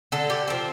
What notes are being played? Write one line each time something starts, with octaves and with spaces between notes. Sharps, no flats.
D3 A4
G4
F3 C4